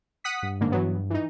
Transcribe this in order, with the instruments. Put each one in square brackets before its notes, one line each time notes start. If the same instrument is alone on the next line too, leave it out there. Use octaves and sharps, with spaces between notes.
[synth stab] F#5 D#6 B6
[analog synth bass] G2
[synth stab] G#2 D3 A#3
E3 F#3 B3
E3 D#4